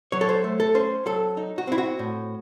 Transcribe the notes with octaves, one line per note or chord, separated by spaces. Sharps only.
F#3 C#5
A4
C5
A3
A4
C#4 C5
F#3 A4
D#4
F#4
C4 E4
F#4
A2